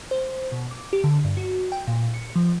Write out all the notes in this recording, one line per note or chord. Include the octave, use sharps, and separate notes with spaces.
C5
B2
D6
G4
D3
G2
F#4
G5
A#2
C#7
F3